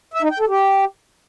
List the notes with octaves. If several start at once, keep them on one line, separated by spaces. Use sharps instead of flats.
E5
D#4
G5
A4
G4